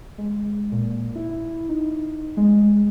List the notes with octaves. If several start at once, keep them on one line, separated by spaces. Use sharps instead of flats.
G#3
A#2
E4
D#4
G#3